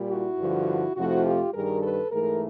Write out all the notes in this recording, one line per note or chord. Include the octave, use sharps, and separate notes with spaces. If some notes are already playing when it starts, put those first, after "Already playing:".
Already playing: A#2 G3
E4 F#4
G2 D3 F3
F2 C3 F3 A3 E4 F#4
F4 G4
G2 D#3 G3 G#4 A#4
A4 B4
G#2 E3 A3 G#4 A#4